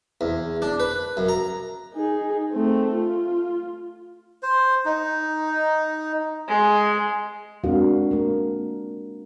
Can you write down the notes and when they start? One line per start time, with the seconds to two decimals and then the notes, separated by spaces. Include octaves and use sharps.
0.21 E2
0.62 D4
0.80 B4
1.17 F#2
1.29 A#5
1.94 D#4 G#4
2.52 A3 C4
2.94 F4
4.43 C5
4.85 D#4
6.48 G#3
7.64 G#3 C4 D4 F#4 A#4 F5
8.11 A#3 A#4